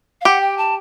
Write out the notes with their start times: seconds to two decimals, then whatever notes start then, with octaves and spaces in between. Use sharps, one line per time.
0.21 F5
0.25 G4 F#5
0.41 G5
0.58 A5